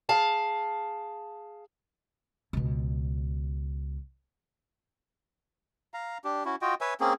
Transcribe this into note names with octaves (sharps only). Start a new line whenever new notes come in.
G#4 F5 A5
C#2 B2
F5 A#5
D4 G4
C#4 E4 F#4
F4 F#4 D#5 G5
B4 C#5 E5 G#5
A#3 C4 C#4 G#4